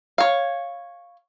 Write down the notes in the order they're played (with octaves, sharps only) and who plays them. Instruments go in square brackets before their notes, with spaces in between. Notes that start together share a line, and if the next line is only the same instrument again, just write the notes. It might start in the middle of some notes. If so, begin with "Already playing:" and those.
[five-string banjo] C#5 F5